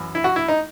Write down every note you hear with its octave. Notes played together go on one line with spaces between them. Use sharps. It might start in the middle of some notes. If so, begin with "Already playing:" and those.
Already playing: F#2 E3
E4
F#4
E4
D#4